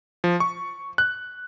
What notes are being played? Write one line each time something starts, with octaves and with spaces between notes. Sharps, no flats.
F3
C#6
F#6